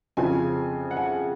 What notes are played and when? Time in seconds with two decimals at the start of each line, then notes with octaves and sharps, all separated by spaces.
0.17 F2 C#3 F3 G#5
0.91 F#5
0.96 G#5